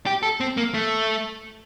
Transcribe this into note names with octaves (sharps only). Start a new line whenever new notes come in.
G4
A4
C4
A#3
A3